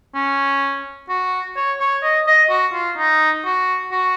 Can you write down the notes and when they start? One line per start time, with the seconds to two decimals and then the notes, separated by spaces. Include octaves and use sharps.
0.15 C#4
1.09 F#4
1.57 C#5
1.80 C#5
2.03 D#5
2.27 D#5
2.50 F#4
2.74 F4
2.97 D#4
3.45 F#4
3.92 F#4